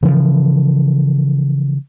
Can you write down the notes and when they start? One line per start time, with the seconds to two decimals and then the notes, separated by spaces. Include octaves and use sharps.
0.03 C#3 E3 F3